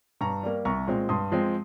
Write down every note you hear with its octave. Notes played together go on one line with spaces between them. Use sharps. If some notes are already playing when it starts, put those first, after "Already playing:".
G2 A#5 C#6
G3 A#3
C2 A#5 C#6
A#2 G#3 C4
G2 C6 D#6
F3 G#3 C4